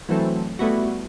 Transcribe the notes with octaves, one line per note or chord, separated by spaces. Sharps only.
E3 F#3 A3 C4 A4
G3 A3 B3 E4 F#4